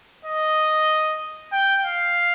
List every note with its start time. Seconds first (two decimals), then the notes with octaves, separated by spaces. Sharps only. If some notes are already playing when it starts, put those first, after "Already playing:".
0.25 D#5
1.52 G5
1.84 F5